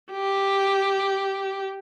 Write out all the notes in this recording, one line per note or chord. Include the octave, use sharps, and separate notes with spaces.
G4